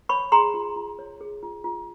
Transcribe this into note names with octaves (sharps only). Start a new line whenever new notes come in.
C#5 B5 C#6
G#4 A#5 C6
F4
F4
C#5
G#4
F4
F4